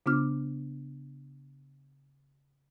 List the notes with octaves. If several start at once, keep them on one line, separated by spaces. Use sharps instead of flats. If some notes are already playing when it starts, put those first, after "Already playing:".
C#3 B3 D4 F4 D6 F6